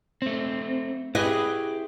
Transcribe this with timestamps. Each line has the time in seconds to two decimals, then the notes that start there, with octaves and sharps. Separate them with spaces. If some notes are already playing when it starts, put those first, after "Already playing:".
0.22 A3 C4
1.15 E4 G4 G#4 B4 D#5